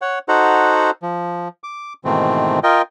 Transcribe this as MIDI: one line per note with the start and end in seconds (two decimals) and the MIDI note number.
0.02 0.19 73
0.02 0.19 78
0.28 0.91 63
0.28 0.91 66
0.28 0.91 69
0.28 0.91 72
0.28 0.91 78
0.28 0.91 82
1.03 1.48 53
1.64 1.93 86
2.05 2.59 44
2.05 2.59 47
2.05 2.59 51
2.05 2.59 52
2.05 2.59 57
2.05 2.59 60
2.63 2.82 65
2.63 2.82 70
2.63 2.82 75
2.63 2.82 79